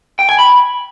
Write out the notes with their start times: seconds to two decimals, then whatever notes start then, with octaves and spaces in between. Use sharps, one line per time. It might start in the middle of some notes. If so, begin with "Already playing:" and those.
0.19 G5
0.29 G#5
0.39 B5